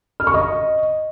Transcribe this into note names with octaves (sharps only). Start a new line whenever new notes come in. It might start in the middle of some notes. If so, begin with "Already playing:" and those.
F6
C#6
D#5